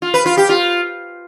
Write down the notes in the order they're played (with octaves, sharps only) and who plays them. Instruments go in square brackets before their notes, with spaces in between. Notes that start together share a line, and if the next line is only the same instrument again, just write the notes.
[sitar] F4
B4
F4
G4
F4